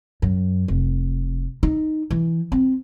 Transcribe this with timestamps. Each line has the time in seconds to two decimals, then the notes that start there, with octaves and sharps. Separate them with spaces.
0.22 F#2
0.68 F1
1.63 D#4
2.10 E3
2.52 C4